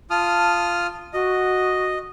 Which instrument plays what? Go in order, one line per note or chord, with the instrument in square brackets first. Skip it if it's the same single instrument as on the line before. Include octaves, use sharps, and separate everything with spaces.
[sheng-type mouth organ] F4 D#6 F6 [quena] A5
[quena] F#4 [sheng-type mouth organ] D#5